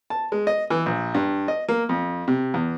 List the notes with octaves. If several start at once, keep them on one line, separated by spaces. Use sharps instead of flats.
A5
G#3
D#5
E3
A#1
G2
D#5
A#3
F2
C3
E2